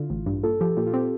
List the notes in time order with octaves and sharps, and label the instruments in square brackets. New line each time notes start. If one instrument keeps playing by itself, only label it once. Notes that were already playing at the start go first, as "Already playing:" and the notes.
Already playing: [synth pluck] D3 [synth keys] E4 F4
[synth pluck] A1
G2
[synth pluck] A#2 [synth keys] A4
[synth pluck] F3 [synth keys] G4
[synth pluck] A#2 [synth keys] G4
[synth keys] F4
[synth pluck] C4 [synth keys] G4